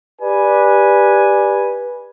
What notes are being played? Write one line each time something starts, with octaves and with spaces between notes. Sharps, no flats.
G4 B4 D5 G#5